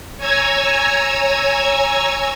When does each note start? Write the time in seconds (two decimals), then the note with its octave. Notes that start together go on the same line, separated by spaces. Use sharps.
0.17 C#5 G#5 A#5 E6 G#6